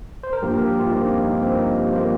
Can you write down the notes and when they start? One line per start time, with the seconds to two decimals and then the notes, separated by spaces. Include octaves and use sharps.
0.23 C5
0.33 A#4
0.42 G2 F3 A#3 G4
0.54 A#4
0.67 G4
0.80 F4
0.92 G2 F3 A#3 D#4
1.09 C4
1.25 D#4
1.42 G2 F3 A#3 C4
1.59 D#4
1.76 G4
1.93 F3 A#3 C5